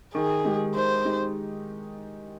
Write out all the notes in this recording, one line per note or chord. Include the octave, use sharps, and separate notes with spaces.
D#3 G#4
G#3 D#4 G4
D#3 C5
G#3 D#4 G4